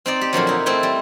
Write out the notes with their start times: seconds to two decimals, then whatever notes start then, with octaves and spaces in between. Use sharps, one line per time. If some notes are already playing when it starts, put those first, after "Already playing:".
0.06 C4 D#4 D5
0.21 G4
0.33 A#2 D3 F3 F#3
0.47 D#4 E4
0.66 A3 C4 E4 G5 G#5
0.83 G3